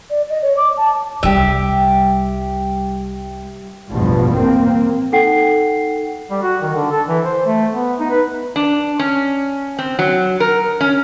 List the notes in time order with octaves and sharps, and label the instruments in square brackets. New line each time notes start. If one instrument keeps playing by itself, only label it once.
[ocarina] D5
D#5
C#5
D6
A5
[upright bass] C2 G3 [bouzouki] G4 E5
[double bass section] A1 E2 G2 B2 F3
A#3 C4
[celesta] D#4 A4 F#5 G5 C7
[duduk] G3
F#4
D#3
D3
A4
E3
C5
A3
B3
D#4
B4
[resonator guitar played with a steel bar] D4
C#4
C4
F#3
A#4
C#4